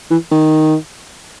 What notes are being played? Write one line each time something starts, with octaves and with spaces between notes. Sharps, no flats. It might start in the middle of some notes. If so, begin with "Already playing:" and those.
E3
D#3